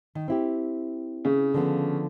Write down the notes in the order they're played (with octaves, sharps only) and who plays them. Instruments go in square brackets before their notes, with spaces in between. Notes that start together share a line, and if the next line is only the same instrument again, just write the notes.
[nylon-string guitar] D#3
C4 E4 G4
[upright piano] C#3
[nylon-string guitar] D3 F3 B3